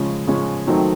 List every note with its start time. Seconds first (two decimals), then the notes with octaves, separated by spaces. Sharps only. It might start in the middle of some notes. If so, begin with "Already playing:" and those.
Already playing: C#3 F3 G#3 C#4
0.27 C#3 F3 G#3 C#4
0.67 D#3 F#3 A3 C4 D#4